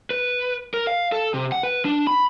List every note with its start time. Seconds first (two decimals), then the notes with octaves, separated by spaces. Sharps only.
0.10 B4
0.74 A#4
0.87 F5
1.12 A4
1.34 C3
1.52 F#5
1.63 B4
1.85 D4
2.07 B5